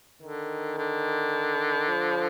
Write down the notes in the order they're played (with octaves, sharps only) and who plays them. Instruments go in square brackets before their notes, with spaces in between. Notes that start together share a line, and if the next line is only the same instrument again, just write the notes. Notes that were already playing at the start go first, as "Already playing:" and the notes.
[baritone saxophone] D3 [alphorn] D#3
[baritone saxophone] D3
[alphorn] F3